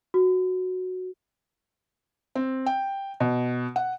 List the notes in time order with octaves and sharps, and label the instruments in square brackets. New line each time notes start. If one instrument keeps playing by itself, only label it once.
[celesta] F#4
[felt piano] C4
G5
B2
F#5